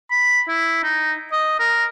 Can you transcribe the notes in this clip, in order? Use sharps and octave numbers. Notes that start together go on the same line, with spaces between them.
B5
E4
D#4
D#5
A#4